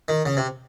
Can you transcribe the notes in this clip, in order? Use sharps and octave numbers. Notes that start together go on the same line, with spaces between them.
D#3
C#3
C3